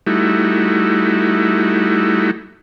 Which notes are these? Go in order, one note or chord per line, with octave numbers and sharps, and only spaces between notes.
G3 A3 D#4 E4 F#4